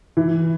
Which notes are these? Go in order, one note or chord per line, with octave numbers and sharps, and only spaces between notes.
E3